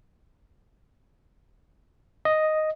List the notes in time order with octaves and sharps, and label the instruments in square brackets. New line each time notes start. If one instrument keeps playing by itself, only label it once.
[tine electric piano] D#5